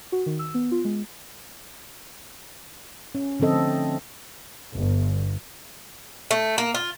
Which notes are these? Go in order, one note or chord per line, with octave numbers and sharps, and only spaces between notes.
F#4
D#3
E6
B3
F4
G#3
C#4
D3 F3 C4 A4 D#5
A3
G1
A3
A#3
F4